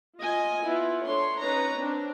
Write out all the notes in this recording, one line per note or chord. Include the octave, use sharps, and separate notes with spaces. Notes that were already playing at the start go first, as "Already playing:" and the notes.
F4 D#5 G#5
B3 E4 F4
D4 A4 C#5 C6
C#4 D#4 B4 C#5 A#5
C4 D4